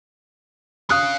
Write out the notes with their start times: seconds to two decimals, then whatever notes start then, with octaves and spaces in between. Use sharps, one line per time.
0.90 C#4 F5 D#6 F#6